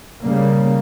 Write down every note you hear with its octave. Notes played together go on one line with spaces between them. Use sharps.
C#3 G3 A#3